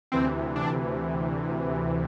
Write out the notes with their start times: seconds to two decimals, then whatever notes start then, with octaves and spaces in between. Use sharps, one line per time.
0.12 D2 C3 E3 C4
0.56 D4